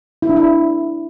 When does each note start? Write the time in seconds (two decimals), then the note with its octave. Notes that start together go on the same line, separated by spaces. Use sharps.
0.22 E4
0.29 D4
0.36 E4